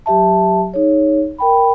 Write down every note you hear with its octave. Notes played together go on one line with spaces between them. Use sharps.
F#3 G4 E5 A5
D#4 G#4 C#5
A#4 G5 B5